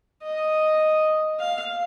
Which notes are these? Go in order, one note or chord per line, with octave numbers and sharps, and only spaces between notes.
D#5
F5